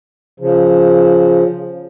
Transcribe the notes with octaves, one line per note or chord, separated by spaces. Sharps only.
C#3 F3